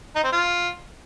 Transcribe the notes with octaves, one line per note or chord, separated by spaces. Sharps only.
D#4
C4
F4